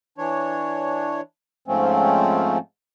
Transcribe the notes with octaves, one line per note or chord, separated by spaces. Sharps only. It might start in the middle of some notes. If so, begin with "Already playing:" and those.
E3 D4 C#5
G#2 F3 A3 C4 C#4